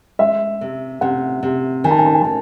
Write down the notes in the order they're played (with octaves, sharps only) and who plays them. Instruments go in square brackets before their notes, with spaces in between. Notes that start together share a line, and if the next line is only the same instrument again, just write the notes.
[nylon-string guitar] G#3 [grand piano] E5
[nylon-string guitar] C3
[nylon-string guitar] C3 [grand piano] F#5
[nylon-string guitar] C3
[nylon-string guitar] D#3 [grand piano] G#5
[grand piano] A5
G#5
A5
G#5
A5
[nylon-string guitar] D#3